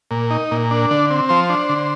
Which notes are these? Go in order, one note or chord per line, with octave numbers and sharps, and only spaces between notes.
A#2
D#4
A#2
D4
D3
C4
F3 C5
D4
D3